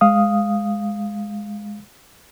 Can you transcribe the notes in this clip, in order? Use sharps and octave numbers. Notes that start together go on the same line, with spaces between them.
G#3 F5 D#6